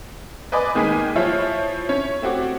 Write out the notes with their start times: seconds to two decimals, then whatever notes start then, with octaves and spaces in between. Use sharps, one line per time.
0.52 B4 D5 D#5 G#5 B5 D6
0.75 D#3 G#3 A#3 G#5 B6 D#7
1.16 F3 E4 F4 C#5
1.89 C#4 C#5
2.22 A3 C4 F#4 D6